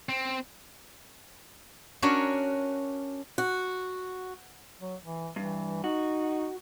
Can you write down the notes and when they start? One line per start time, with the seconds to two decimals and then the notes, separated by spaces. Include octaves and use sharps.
0.09 C4
2.02 C#4 D4 F#4 A#4 C#5
3.38 F#4
4.81 F#3
5.03 E3
5.36 G2 E3
5.84 D#4 F#4